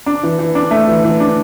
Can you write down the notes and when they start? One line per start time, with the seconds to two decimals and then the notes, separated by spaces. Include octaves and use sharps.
0.06 D4
0.23 E3
0.39 E3
0.55 D4
0.71 A3
0.88 E3
1.04 E3
1.20 D4